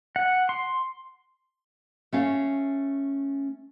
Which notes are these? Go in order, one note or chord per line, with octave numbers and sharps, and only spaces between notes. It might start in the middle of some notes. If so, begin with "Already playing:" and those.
F#5
C6
A3 C#4 F5